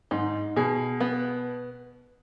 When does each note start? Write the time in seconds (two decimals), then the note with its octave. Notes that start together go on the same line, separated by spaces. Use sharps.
0.11 G#2 D#4
0.56 B2 G#4
1.00 B3